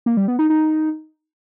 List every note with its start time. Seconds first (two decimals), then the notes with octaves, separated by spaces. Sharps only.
0.06 A#3
0.17 G3
0.28 B3
0.39 D#4
0.50 D#4